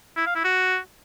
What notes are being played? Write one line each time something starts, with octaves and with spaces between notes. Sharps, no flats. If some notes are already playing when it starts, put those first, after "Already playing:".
E4
F5
E4
F#4